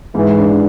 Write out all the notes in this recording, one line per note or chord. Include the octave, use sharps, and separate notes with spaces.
G#2 E3
D4